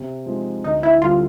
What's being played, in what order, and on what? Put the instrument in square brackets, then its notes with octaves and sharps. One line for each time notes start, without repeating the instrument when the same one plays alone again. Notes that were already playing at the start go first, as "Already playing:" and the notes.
Already playing: [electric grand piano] C3
F3 G#3 C4 D#4
[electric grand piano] D2 [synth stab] D#4
[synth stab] E4
[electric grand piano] D3 G3 C4 E4 [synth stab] F4